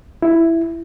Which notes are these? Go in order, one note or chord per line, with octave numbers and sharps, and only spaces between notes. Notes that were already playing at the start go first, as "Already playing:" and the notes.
E4